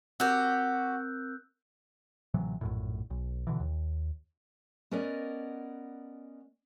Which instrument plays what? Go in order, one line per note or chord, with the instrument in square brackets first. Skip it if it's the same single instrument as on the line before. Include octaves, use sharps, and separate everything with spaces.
[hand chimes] C4 A#4 [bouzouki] F#4 G4 [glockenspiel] E6 F#6 G6
[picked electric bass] A1 C3 E3 F#3
A#1 F#2 A2
B1
B2 D3 E3
D#2
[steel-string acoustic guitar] B3 C#4 A#4 D5 D#5